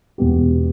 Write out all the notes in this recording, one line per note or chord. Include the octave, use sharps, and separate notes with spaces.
E1 E2 B2 B3 G4